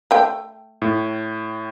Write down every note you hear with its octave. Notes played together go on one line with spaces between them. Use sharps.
A3 G5
A2